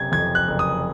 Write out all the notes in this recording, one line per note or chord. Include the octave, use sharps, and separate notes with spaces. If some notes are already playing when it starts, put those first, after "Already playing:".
Already playing: F#1 C3 G#6
F2 G#6
F#6
F#1
D#6